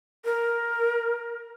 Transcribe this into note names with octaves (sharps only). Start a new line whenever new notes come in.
A#4